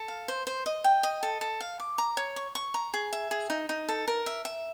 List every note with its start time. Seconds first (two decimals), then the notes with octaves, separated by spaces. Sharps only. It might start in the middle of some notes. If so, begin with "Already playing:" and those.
Already playing: A4
0.08 F5
0.28 C5
0.47 C5
0.66 D#5
0.84 G5
1.03 D#5
1.23 A4
1.41 A4
1.61 F5
1.80 D6
1.98 A#5
2.17 C#5
2.36 C#6
2.55 C#6
2.74 A#5
2.94 G#4
3.13 E5
3.31 G#4
3.50 D#4
3.69 D#4
3.88 A4
4.08 A#4
4.26 E5
4.45 E5